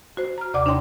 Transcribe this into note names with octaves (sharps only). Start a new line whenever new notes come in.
F#4 C5
A#5 F6
D#2 C3 D5 F#5 D6
D4 D#4 C#5 G5 C6